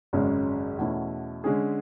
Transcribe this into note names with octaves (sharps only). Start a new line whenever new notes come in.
G#1 F#2 C#3 G#3 C#4
E2 B2 A3 C#4 E4
D3 G#3 C#4 G#4